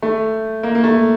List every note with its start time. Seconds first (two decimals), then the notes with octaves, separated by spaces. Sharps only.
0.02 A3
0.63 A#3
0.75 A#3
0.84 A3